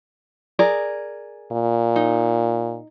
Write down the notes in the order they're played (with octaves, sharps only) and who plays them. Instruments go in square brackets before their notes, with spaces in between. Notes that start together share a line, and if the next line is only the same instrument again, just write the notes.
[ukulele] G#4 A#4 D5
[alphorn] A#2
[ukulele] D#4